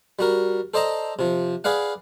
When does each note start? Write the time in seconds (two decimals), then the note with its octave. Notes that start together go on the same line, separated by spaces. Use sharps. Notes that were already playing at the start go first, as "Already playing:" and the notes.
0.19 G3 F#4 A#4
0.74 A4 C5 D5 D#5 A5 A#5
1.19 C3 F3
1.64 G#4 B4 D5 F5 F#5